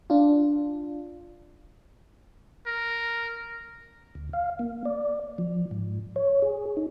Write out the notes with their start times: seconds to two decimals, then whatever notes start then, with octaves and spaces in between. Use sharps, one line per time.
0.10 D4 F4
2.66 A#4
4.15 D2
4.33 F5
4.59 A#3
4.85 D5
5.38 F3
5.71 G#2
6.16 C#5
6.42 G#4
6.77 D#4